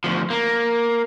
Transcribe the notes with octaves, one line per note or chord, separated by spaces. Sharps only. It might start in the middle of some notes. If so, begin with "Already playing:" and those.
D2 F3
A#3